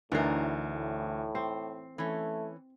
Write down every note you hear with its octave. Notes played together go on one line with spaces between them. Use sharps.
D2 A2 E3 D4 D#4 A#4 C7
A2
C4 C7
E3 A3 C#4